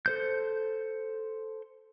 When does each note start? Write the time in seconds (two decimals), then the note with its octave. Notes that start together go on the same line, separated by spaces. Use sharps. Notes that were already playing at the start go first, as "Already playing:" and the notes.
0.06 A4 C5 G6